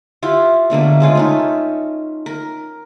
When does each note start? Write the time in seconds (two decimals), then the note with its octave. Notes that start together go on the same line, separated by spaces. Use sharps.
0.23 E4 F4 G4
0.70 B2 D3 A3 A#3
1.00 C#3 G#3 F4 B4
1.15 A3 C#4 D#4
2.26 A#4